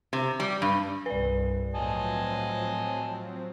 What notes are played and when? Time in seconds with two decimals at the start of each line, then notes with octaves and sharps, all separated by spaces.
0.13 C3
0.40 G3
0.62 G2
1.06 C2 G2 B4 D5
1.75 A2 F3 F#3 C4 D#5 G#5 A5